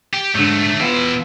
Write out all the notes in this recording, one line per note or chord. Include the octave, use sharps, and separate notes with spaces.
G4
G#2 D3 F#3 A3
B2 E3 B3 E4 F4